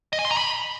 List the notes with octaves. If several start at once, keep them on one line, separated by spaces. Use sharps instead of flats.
D#5
G#5
C6
A#5
B5